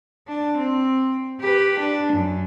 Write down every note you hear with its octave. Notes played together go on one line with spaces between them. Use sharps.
D4
C4
G4 B4
D4
F#2